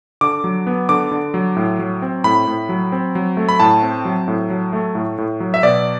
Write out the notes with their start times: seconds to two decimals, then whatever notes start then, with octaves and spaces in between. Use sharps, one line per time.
0.21 D3 D6
0.44 F#3
0.67 B3
0.89 D3 D6
1.12 D3
1.34 F#3
1.56 A2
1.79 F#3
2.02 C4
2.24 A2 B5
2.47 A2
2.69 F#3
2.92 C4
3.15 F#3
3.37 A3
3.49 B5
3.60 A2 A5
3.82 C4
4.05 F#3
4.28 A2
4.50 F#3
4.73 A3
4.95 A2
5.18 A2
5.40 F#3
5.54 E5
5.63 B2 D5